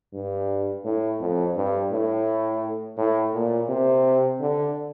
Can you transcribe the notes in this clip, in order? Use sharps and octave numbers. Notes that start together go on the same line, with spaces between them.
G2
A2
F2
G2
A2
A2
A#2
C3
D3